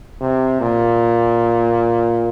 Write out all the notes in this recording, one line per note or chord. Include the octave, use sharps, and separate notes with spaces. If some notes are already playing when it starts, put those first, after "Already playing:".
C3
A#2